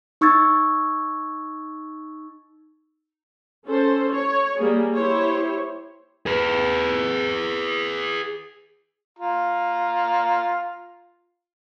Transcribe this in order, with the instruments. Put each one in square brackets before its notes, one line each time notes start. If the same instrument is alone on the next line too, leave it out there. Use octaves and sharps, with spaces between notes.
[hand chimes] D#4 C#6 E6 G#6 A6
[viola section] C#4 A4 C5
C#5
G3 A#3 G#4
E4 G4 C5 C#5
[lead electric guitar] G#4 B4
[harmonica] F4 A#5